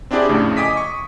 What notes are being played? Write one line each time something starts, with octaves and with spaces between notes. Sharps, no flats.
C4 D4 E4 G4 G#4 D5
F2 A2 C#3 A3
D#5 G#5 D6 D#6 B6
C#6 D#6